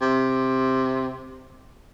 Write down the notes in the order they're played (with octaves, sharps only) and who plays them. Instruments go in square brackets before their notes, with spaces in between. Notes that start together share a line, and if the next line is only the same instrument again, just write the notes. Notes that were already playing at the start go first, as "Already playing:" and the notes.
[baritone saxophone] C3